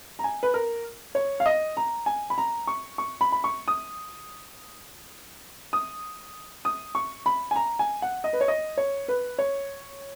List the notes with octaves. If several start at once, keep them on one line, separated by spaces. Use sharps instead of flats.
A#5
G#5
B4
A#4
C#5
F5
D#5
A#5
G#5
B5
A#5
C#6
C#6
B5
B5
C#6
D#6
D#6
D#6
C#6
B5
G#5
A#5
G#5
F#5
D#5
B4
C#5
D#5
C#5
B4
C#5